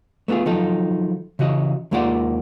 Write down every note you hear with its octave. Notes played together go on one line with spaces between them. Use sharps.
A3 B3 D#4 F4 G#4
D#3 F3 F#3 D#4 A4
C#3 E3 F#4 D#5
D#2 G#3 A#3 F4 D5 F#5